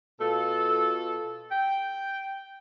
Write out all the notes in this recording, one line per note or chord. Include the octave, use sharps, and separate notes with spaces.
B2 F4 A4
G5